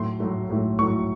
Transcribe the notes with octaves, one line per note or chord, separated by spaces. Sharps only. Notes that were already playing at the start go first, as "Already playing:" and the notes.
Already playing: A2 F#3 A3 C6
A2 F#3 A3
A2 F#3 A3
A2 F#3 A3 C#6